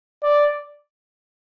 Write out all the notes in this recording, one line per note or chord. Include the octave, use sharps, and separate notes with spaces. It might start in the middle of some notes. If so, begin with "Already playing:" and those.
D5